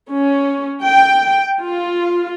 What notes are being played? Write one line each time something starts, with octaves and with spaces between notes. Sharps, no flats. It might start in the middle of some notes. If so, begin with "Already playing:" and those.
C#4
G5
F4